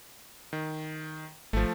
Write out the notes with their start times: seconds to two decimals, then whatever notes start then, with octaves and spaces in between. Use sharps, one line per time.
0.53 D#3
1.53 G#1 F3 A3